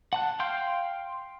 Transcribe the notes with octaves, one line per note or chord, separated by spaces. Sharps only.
F#5 A5 F#6
F5 G5 C6 F6 G6